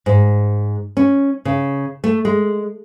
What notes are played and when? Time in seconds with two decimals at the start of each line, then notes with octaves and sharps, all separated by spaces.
0.06 G#2
0.97 C#4
1.45 C#3
2.04 A3
2.25 G#3